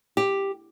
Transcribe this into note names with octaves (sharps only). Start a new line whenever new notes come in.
G4